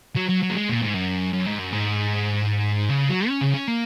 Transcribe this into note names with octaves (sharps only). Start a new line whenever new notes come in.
F#3
F#3
F#3
A#3
G#3
A#2
G#2
F#2
F#2
G#2
F#2
G#2
C#3
F#3
C#4
C#3
C#4
A#3